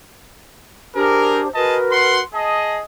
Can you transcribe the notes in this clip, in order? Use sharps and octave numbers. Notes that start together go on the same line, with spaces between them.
D4 G4 G#4 A#4 C5
F#4 G#4 A#4 B4 D#5 A5
F#5 C6
G#4 D#5 A5